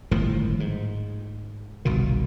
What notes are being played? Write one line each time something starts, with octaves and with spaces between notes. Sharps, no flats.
G1 A2 D#3 F3
G#2
G1 C2 B2 D#3